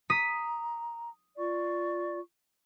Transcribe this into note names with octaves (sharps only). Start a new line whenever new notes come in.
A#5 D#6 B6
F4 D5 C#6